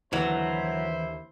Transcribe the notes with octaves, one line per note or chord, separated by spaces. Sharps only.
D#2 D3 E3 F#3 E4 C5